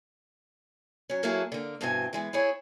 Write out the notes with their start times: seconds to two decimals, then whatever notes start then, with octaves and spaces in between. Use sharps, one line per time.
1.09 F#3 C#4
1.23 F#3 A#3 E4 F#4 G#4 A4
1.52 D3 A#3
1.81 G2 B2 E3 C4 G#4 G#5
2.13 E3 G#3 B3
2.33 C4 E4 G#4 C#5